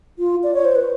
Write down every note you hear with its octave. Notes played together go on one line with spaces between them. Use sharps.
F4
D5
C#5
C5
B4